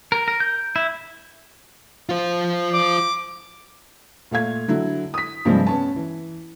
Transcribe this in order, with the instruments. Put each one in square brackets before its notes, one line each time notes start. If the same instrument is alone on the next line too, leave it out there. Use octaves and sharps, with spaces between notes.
[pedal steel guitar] A#4
A#4
G6
E4
[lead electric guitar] F4 C5
[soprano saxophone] D6
[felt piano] A#2 A3 F5 G#6
D3 F#3 E4
D#6 B6
G2 C3 F3 G3 G#3
B3 C#4 A5
E3